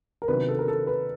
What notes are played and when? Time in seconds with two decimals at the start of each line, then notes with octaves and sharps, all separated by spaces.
0.22 A#4
0.28 C3 D#3 F#3 B3 D4 B4
0.48 A4
0.59 A#4
0.68 A4
0.87 B4